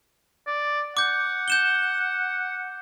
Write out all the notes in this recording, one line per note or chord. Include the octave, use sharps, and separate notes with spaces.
D5
F#5 D6 G6
G6 E7 G7